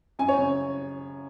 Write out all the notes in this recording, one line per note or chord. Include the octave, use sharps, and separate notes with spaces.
F#2 G#5
C#5
C#3